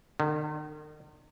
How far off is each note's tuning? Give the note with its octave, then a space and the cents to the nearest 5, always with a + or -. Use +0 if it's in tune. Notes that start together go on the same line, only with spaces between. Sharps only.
D#3 -40